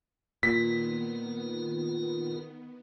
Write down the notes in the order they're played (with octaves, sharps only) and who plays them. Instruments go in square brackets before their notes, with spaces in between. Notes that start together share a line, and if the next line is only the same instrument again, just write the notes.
[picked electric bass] A#2 [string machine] D#3 B3 [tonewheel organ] F4 A#4 [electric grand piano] B6